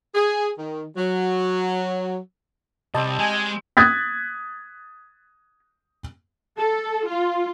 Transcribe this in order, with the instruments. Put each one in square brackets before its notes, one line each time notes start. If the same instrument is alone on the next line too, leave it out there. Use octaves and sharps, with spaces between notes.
[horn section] G#4
D#3
F#3
[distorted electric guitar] C2 [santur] G3 C4 E6 [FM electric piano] D#5 A5
[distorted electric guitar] G#3 [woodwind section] G#5
[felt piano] D#6 F#6 G#6 A6 B6
[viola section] A4
F4